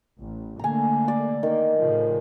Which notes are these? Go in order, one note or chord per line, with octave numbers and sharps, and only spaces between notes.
A1
D3 A3 A#3 G#5 A#5
D5
D#3 A#3
A2 C#3 F3